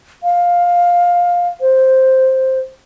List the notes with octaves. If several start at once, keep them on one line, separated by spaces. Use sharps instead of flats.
F5
C5